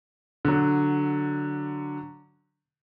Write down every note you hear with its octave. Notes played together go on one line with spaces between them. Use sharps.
D3 F#3